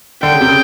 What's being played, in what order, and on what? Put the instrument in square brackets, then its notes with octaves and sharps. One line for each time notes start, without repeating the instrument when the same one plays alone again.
[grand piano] D3 [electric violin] G5
[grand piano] C#3
C3
C#3